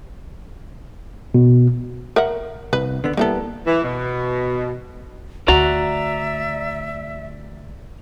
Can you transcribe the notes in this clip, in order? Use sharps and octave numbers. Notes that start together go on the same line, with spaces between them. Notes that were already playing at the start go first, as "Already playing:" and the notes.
B2
A#4 E5 F#5
C2 B4
D3 B3
G3 A#3 B3 E4 A4
E3
B2
D2 F#4 D5 E5 A#5